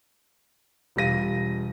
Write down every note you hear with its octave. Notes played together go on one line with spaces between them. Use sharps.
E1 G3 F4 A#6 D#7